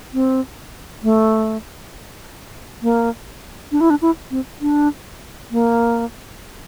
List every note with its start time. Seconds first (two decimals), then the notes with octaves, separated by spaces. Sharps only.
0.14 C4
1.03 A3
2.82 A#3
3.72 D4
3.81 E4
3.90 D4
4.02 E4
4.31 C4
4.61 D4
5.51 A#3